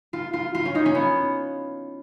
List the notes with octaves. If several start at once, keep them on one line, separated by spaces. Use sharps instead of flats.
F4
F4
F4
C#4
D#4
C#4
B3